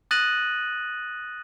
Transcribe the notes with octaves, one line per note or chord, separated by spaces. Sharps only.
D#6 F#6 A6 A#6 D#7 F#7